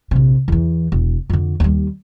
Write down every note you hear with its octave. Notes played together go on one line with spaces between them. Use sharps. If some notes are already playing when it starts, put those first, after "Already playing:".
A#1 C3
E2 E3
E1
F2 D3
D#2 G3